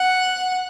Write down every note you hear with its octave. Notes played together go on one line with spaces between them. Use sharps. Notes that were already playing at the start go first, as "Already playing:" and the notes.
Already playing: F#5